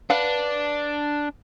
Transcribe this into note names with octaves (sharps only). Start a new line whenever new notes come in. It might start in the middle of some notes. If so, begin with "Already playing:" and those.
D4 B4 F5 F#5